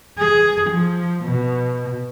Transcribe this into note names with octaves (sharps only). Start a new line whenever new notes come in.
G#4
F3
B2